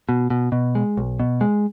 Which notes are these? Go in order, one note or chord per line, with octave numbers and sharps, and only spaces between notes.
B2
B2
B2
G#3
B1
B2
G#3